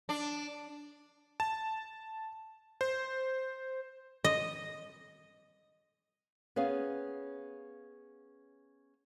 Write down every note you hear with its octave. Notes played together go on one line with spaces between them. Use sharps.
D4
A5
C5
D#5
B3 C#4 G#4 F5